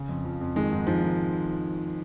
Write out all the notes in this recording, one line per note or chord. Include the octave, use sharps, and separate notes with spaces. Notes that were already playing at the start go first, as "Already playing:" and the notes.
Already playing: C#3
F2
F3
F2
D#3 G#3
G#2
G#2 F3
D#3